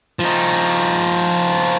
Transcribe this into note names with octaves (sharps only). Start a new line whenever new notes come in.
F3 D#4